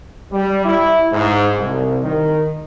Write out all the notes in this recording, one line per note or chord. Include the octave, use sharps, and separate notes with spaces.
G3
E4
G#2
C2
D#3